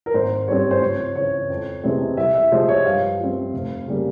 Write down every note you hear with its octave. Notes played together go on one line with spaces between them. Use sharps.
A#4
G#1 C5
G2 G3 C4 C#5
C5
C#2 C#5
C#3 E3 C#5
F2
C3 E3 G#3 C4
C2 E5
E5
C3 F3 G#3 C5
C#5
G2 F5
F3 C4
F1
C#3 G3 A#3